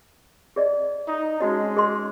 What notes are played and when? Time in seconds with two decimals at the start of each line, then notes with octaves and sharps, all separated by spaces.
0.56 G#4 D5 D#5
1.08 D#4
1.41 G#3 C#4 D#4 F#4 D#5
1.77 G#4 D#5 C6